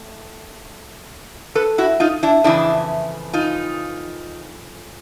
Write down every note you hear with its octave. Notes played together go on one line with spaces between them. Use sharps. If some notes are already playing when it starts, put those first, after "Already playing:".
Already playing: A2
A4 B4
E4 F#4
D#4 F4
D4 E4
F2 C#3 E3 D4 E4
D#4 F4